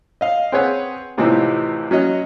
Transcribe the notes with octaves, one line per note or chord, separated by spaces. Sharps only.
D#5 F5
C4 G#4 B4 C#5 F#5
A2 C3 E3 F3 C4 D#4
F#3 C#4 C#5 D#5